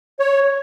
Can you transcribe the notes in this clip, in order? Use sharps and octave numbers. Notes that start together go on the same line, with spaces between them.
C#5